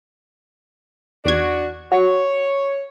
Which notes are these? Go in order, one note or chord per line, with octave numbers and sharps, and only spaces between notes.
E2 D4 F#4 G#6
F#4 C#5